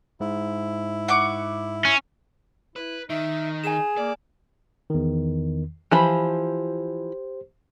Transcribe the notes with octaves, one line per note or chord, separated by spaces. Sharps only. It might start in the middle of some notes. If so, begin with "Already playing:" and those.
G#2 E4
F#5 C#6 D6
C#4
E4 B4
D#3 D#4 E5
G#4 G#5 E7
A#3 D5
E2 D#3
E3 F3 G4 C5 B5